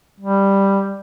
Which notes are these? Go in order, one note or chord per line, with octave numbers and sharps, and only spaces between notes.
G3